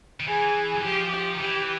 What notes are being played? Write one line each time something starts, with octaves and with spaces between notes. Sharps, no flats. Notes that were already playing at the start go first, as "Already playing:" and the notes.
D#3
E3 G#4
F#3
F3 G4
G4
D#3
E3 G4